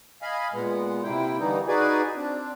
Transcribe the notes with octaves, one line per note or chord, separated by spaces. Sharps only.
D#5 F5 G#5 B5
A#2 G#3 B3
C3 A#3 E4 G5
D3 E3 G3 A#3 D#4
D#4 F#4 G#4 B4 D5 G#5
C4 D4